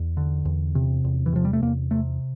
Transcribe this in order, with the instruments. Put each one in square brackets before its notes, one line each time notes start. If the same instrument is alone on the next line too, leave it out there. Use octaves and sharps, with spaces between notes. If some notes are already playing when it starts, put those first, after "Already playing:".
Already playing: [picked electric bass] E2
D3
E2
C3
E2
E3
C3 F3
G3
A3
E2 A#3
C3 A3